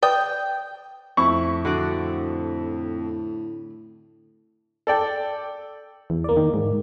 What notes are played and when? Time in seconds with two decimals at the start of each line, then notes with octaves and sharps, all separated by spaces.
0.03 B4 D5 G5 D#6
1.17 F2 A2 E4 C#6
1.65 D3 F#4 D5
4.87 A4 D5 G5
6.10 E2
6.24 A#3 D5
6.37 D#3
6.54 G#2